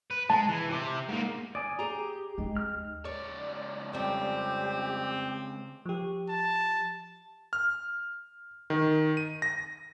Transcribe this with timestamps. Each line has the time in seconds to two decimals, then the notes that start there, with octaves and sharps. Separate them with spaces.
0.11 B4
0.30 G#3 A5
0.49 E3
0.70 C3 G4
1.09 G#2 A#3
1.55 D5 G#5 D#6
1.79 G4 G#4 A#5
2.38 D#2 G#3 D#5
2.57 F6
3.05 C#2 C#5 D5
3.93 F2 G3 C4 G4
5.86 F3 G4
6.29 A5
7.53 F6
8.70 D#3
9.17 D#7
9.42 A#6